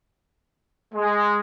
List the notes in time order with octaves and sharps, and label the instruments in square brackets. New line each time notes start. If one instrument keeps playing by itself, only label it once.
[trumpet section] G#3